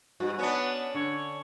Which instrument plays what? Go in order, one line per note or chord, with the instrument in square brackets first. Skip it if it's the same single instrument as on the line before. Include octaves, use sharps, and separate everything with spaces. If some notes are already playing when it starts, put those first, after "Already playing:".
[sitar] G2 [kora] F#4
[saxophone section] B3 [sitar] C#4 D4
[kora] D3 [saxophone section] C#5